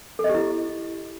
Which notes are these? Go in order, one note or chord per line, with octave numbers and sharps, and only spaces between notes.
A4
D#5
G4
E4